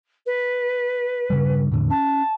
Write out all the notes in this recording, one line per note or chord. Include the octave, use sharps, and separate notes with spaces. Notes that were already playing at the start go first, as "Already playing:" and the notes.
B4
G2 C#3 G3
E2 A2 D3
C#4 A5